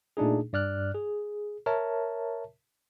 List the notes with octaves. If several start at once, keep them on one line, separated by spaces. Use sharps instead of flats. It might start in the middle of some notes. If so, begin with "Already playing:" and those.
A#2 A3 D4 D#4 G#4
G2 D5 F6 F#6
G#4
A#4 C#5 E5 A5